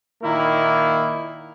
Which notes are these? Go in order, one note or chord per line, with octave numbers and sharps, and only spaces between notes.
A#2 D#3 A#3 E4 A#4